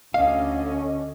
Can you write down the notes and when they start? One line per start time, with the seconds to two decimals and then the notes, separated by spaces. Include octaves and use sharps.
0.14 D2 D3 C#4 D#5 F5